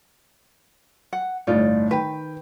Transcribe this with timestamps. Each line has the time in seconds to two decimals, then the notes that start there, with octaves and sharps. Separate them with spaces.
1.13 F#5
1.47 G1 A2 D#4 F4 D5
1.91 D#3 B4 G5